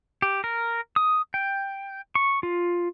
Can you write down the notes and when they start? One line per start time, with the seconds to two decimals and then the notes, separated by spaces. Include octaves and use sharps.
0.22 G4
0.44 A#4
0.96 D#6
1.34 G5
2.15 C#6
2.43 F4